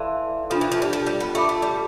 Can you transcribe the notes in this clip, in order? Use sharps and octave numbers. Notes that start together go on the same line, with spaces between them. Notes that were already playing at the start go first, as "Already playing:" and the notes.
Already playing: E3 A4 D5 F5 A5 C6
F3 D4 F4 A4
E3
F3
G3
F3
G3
B3
A3 F4 A4 E5 B5 D6
A3
G3